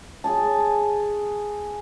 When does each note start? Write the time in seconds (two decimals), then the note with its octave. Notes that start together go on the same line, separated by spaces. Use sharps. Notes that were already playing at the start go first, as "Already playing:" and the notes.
0.24 G#4 G#5 A5